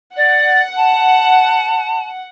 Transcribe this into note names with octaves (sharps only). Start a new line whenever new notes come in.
D5 F#5
A5